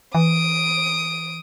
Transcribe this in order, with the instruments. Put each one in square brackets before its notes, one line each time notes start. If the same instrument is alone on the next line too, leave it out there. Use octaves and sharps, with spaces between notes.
[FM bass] E3 [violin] D#6 D7